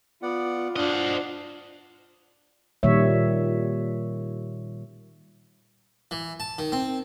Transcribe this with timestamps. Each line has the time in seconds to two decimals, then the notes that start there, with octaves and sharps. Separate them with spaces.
0.22 B3 F4 D5 F#5
0.76 D4 C5 D#5 F#5 F6
2.83 A#2 D#3 G3 C#5 E5
6.11 E3
6.40 A5
6.58 D#3
6.72 C4